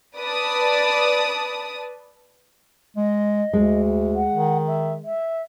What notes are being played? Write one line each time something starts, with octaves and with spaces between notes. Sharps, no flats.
B4 D5 A5 D#6
G#3 D#5
D2 G#3
F#5
D#3
E5
E5